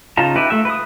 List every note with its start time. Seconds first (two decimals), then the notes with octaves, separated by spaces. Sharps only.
0.17 C#3 D#4 F4 A5 A#5
0.36 D#4 E4 G4 B4
0.50 A3 E5
0.65 B4 D#6